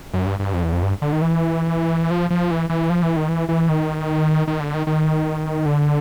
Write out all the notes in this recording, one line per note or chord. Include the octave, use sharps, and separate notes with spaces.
F#2
G2
G2
F2
E2
F2
G2
D3
D#3
E3
F3
F3
E3
E3
F3
E3
D#3
E3
E3
D#3
D#3
D3
D#3
D#3
D3